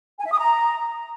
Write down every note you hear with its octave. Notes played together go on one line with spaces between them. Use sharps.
G#5
E5
D#6
A#5